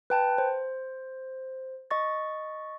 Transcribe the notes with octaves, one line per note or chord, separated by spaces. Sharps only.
B4 G5 A5
C5
D#5 C#6 A6